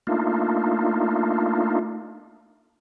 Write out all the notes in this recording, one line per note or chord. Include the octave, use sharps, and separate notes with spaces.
A3 A#3 D4 D#4 F4